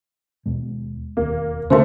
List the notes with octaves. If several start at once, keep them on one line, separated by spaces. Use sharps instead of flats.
D#2 B2 G#3
E1 D#2 A#3
D3 A3 A#3 C5 C6